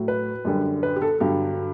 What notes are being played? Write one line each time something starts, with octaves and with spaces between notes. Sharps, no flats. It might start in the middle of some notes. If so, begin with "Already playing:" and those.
Already playing: A2 F#3
B4
F#2 D3 G3
B4
G4
A4
G2 D3 F#3 G4